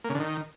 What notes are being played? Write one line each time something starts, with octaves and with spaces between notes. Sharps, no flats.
A#3
C#3
D3
D#3